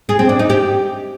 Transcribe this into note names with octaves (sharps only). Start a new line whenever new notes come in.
G#4
C4
D4
D#4
G4